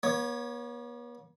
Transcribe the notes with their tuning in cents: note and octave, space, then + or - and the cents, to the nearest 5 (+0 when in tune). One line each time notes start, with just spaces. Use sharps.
B3 -45 C#5 +0